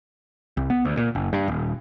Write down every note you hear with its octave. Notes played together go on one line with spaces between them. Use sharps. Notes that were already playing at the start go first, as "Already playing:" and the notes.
C2
B3
D2
A#2
F#1
G2
D#1